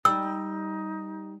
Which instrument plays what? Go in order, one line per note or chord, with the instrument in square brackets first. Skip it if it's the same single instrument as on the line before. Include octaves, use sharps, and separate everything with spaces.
[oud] G3 [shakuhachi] D#4 [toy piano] E6